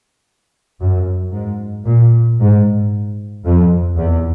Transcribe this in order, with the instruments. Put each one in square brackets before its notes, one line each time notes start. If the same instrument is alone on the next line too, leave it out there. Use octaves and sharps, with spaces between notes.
[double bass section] F#2
G#2
A#2
G#2
F2
E2